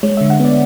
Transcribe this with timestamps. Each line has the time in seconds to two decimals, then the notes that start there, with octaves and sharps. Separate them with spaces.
0.03 G#3 C#5
0.17 D3 E5
0.30 F#5
0.40 B3 D5